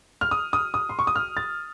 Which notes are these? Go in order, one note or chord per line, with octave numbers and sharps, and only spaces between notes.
F6
D#6
D#6
D#6
C6
C#6
D#6
F6
A6